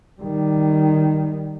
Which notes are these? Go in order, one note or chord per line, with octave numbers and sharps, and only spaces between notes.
D#3 G3